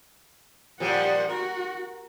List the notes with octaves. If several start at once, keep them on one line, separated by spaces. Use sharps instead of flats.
A#2 F3 G3 G4 F#5
F#4 A#4